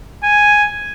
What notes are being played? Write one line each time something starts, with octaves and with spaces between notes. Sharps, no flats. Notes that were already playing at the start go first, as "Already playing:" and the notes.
G#5